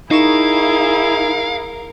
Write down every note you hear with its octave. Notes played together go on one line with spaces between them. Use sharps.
D#4 E4 G#4 A#4 F5 C#6 E7